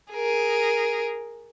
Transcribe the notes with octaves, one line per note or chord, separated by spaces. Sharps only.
G#4 A#4